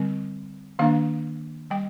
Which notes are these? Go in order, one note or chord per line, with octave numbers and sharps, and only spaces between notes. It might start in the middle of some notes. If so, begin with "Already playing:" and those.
Already playing: D3 G3 C4
D#3 A#3 D4 F5
G3 G5